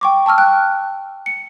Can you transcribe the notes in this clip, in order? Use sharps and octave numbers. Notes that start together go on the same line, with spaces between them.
G5 C#6 D6
A5 C#6 E6 F6
G5 F#6
C#7